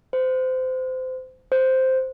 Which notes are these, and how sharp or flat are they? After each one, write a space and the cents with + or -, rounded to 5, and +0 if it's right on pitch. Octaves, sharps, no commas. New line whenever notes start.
C5 -25
C5 +0